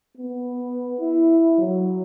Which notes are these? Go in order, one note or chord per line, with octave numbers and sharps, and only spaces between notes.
B3
E4
F#3